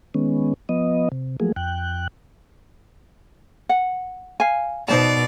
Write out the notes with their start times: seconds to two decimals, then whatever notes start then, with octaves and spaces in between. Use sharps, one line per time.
0.14 D#3 G#3 B3 C#4
0.69 F3 B3 D#5
1.12 C3
1.40 F3 F#3 A3 A#3 G#4
1.56 F2 G5 F#6
3.69 F#5
4.40 F5 G#5
4.88 B2 D#4 C5 D5 A5